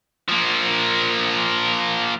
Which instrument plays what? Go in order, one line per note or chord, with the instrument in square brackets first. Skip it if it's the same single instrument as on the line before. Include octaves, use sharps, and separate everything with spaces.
[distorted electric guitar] F3 A#3